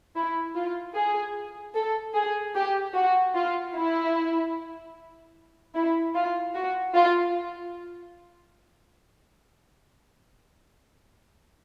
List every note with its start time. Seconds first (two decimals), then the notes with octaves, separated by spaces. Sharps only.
0.16 E4
0.55 F4
0.95 G#4
1.75 A4
2.15 G#4
2.55 G4
2.95 F#4
3.35 F4
3.76 E4
5.75 E4
6.15 F4
6.55 F#4
6.95 F4